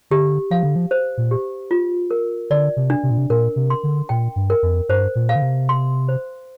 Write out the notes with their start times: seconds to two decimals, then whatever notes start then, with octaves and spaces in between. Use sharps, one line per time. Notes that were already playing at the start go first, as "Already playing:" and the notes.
0.11 D3 G4
0.50 F3 F5
0.63 D3
0.76 F3
0.91 C5
1.17 A#2
1.31 G4
1.71 F4
2.11 A#4
2.50 D3 D5
2.77 C3
2.90 D4
3.03 C3
3.11 A#2
3.18 C3
3.30 A#2 A#4
3.56 C3
3.70 C6
3.83 D3
4.09 A#2 G5
4.36 G2
4.50 A#4
4.63 F2
4.89 G2 C5
5.15 A#2
5.29 F5
5.36 D3
5.42 C3
5.69 C6
6.08 C5